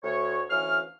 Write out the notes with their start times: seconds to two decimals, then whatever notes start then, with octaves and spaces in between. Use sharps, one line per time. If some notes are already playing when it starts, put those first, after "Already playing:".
0.04 D2 C#5
0.50 D2 E3 C#4 C#5 F5 F6